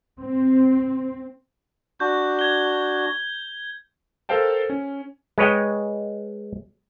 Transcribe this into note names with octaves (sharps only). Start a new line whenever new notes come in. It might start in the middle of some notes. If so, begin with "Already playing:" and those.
C4
D4 F#4 G6
G#6 G7
A4 A#4 C5 F5 G5 A5
C#4
G#3 B4 C#5 D#5 G5